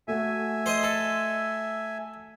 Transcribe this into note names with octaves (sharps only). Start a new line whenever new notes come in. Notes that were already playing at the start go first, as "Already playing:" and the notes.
A3 F#4 E5 G#5
C5 D#5
A4